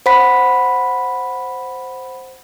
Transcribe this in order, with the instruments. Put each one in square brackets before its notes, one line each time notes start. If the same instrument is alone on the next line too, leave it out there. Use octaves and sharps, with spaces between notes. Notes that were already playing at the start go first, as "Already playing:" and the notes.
[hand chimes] C5 F#5 B5 B6